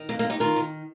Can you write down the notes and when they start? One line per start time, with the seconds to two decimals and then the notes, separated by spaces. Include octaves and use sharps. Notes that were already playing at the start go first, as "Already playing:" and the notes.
Already playing: D#3
0.09 F2 A#3
0.19 A#3
0.25 F2
0.30 D#4 G4
0.40 D#3 F4 A#4
0.56 D#3